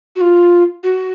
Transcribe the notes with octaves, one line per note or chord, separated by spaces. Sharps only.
F#4
F4
F#4